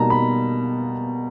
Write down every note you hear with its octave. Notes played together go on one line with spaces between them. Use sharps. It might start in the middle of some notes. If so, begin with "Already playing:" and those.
Already playing: B2 G3 A#3 D#4 A5 A#5
B5